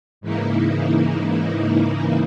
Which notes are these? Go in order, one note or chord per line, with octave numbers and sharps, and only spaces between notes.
G#2 C#3 E3 A#3 D#4 E4